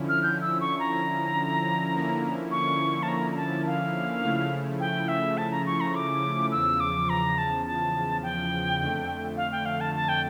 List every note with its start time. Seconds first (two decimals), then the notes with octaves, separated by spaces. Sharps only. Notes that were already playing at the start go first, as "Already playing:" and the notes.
Already playing: D3 F3 C#4 E4
0.09 F6
0.23 G6
0.41 E6
0.61 C#6
0.80 A#5
1.95 D3 F3 A#3 C#4 E4
2.51 C#6
3.03 A5
3.08 A#5
3.32 A#5
3.37 A5
3.66 F5
4.23 C#3 F3 A3 C#4 E4
4.80 G5
5.08 E5
5.38 A5
5.51 A#5
5.66 C#6
5.80 A#5
5.95 D6
6.52 E2 C#3 F3 E6
6.80 D6
7.09 A#5
7.38 A5
7.66 A5
8.23 G5
8.80 F2 D3 A3
9.37 F5
9.52 G5
9.66 F5
9.81 A5
9.95 A5
10.09 G5